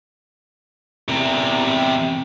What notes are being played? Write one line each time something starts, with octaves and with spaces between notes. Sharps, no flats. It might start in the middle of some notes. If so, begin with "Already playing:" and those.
E2 C3